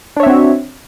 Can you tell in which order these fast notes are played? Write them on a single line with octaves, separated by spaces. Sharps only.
D4 C#5 E5 C4 F#4